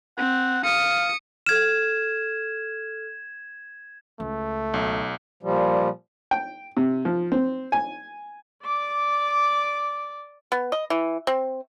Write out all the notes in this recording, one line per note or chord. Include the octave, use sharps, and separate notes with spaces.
C4 F#5
F5 D#6 C#7
A4 F6 G#6 E7
C#2 A3
B1
A#2 F3 G3
G5
C3
F3
C4
G#5
D5 D6
B3
D#5
E3
C4